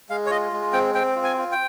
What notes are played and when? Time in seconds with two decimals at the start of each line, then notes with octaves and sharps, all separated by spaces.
0.09 G#3 F5
0.26 C#5
0.30 F4 D#5
0.52 G#3
0.73 C4 G5
0.95 C4 G5
1.16 F4
1.24 G#5
1.38 F4
1.52 G5